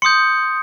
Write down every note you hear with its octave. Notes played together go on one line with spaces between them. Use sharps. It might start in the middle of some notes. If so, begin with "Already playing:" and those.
C6 D#6 G6 C#7